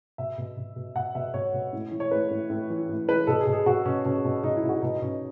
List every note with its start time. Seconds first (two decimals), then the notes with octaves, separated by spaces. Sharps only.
0.18 B2 E5
0.38 B2
0.57 B2
0.76 B2
0.95 B2 F#5
1.15 B2 E5
1.34 B2 C#5
1.54 B2
1.73 A2
1.92 E3
2.00 C#5
2.11 A2 B4
2.30 A2
2.50 A2
2.70 E3
2.88 A2
3.08 E3 B4
3.27 B2 A4
3.41 G#4
3.47 B2
3.53 G#4
3.66 B2 F#4
3.85 B2 C#4
4.05 B2 C#4
4.25 B2
4.43 B2 D#4
4.57 E4
4.63 B2
4.69 F#4
4.82 B2 D#4
5.02 B2 C#4